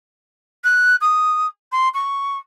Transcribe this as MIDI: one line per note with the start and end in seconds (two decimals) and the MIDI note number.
0.64 0.96 90
1.01 1.46 87
1.72 1.89 84
1.94 2.38 85